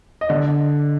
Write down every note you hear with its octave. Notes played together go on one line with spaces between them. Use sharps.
D#5
D3 D5